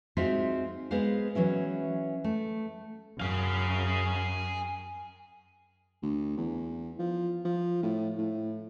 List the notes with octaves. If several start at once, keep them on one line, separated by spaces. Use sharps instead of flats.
G#3 C4 D#4 F4 F#4 E5
G#3 B3 G#4 C5 F5
E3 F#3 C#4 E4
A3
F#2 G#4 F5
D2
E2
F3
F3
A2
A2